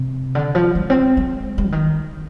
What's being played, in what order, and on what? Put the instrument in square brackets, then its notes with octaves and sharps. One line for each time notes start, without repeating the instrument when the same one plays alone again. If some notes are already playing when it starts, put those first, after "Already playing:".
Already playing: [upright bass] C3
D3
F3
G#3
C4
G#3
G#3
D3
D#3